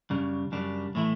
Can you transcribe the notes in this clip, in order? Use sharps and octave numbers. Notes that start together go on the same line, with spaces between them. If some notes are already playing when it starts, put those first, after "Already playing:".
F#2 C#3 G3 D4
F#2 C#3 G3 D4
A2 E3 A3 E4